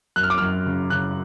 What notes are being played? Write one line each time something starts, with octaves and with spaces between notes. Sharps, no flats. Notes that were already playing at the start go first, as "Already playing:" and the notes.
F#2 F#6
F6
D6
F#2 F6
C#3
C#3 F#6